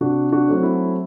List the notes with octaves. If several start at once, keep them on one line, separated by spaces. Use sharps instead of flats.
C3 D4 F#4
D4 F#4
F#3 A3 C4
D4
E4